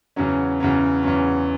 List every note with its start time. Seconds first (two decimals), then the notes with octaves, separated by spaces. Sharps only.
0.16 E2 C#3 F#3 C#4
0.60 E2 C#3 F#3 C#4
1.03 E2 C#3 F#3 C#4